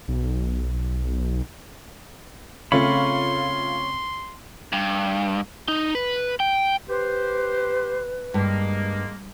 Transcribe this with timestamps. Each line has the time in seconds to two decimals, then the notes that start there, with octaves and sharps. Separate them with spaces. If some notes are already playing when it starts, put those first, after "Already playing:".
0.08 B1
2.72 C#3 A3 C4 C#4 F4 C#5 B5 C6
4.73 G2
5.68 D#4
5.95 B4
6.40 G5
6.88 G4 B4 C5
8.34 G2 G#3 A#3